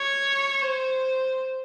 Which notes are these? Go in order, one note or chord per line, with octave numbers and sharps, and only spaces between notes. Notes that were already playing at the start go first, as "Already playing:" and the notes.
Already playing: C#5
C5